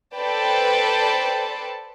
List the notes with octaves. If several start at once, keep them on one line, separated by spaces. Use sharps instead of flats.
A4 B4 C5 D5 G5 A5